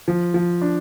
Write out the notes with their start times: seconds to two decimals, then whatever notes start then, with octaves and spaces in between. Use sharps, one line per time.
0.08 F3
0.34 F3
0.61 D4